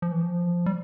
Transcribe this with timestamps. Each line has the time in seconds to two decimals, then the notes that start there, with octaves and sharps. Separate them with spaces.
0.02 F3
0.12 E3
0.23 F3
0.66 G3